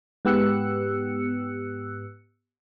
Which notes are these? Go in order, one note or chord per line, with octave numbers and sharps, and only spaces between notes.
G#2 B3 G4 E6 F#6 C#7